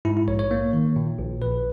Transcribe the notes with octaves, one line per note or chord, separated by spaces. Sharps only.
G#2 E4
E4
A#1 C#5
C#5
A#3
D#3
A#2
A#1
A#1 B4